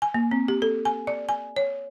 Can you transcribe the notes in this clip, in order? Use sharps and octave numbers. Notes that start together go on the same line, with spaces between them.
G#5
A#3
C4
G4
A4
G#5
D5
G#5
C#5